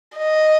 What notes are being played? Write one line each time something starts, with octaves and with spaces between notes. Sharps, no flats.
D#5